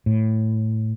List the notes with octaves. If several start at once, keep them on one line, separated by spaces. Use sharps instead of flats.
A2